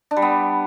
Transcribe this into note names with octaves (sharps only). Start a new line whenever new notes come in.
D4
G3
B3